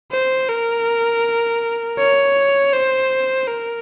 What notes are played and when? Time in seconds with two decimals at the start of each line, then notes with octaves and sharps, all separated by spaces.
0.12 C5
0.49 A#4
1.99 C#5
2.73 C5
3.47 A#4